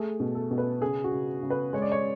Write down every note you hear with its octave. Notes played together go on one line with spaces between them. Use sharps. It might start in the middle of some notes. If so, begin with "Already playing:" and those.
Already playing: A3 G#4
B2
A4
B2
B4
C#3 G#4
F#4
C#3
C#3
B4
G#3 C#5
D5
C#5